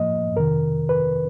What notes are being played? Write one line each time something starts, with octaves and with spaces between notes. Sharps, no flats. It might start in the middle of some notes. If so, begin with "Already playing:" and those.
Already playing: A2 F3 A#3 D#5
F2 C3 D#3 A#4
B4